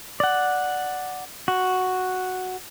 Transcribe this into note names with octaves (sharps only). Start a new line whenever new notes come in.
D5 F#5
F#4